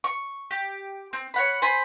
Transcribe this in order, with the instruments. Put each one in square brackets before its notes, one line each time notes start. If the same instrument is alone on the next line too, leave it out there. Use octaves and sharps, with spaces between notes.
[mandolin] C#6
G4
C4
C#5 F#5 B5
C5 G#5 B5